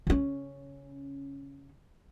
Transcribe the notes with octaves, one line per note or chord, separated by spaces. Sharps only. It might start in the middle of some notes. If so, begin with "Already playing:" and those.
C#3 C#4